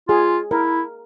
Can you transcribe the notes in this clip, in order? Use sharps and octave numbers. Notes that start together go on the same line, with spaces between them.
F4 G#4
E4 A#4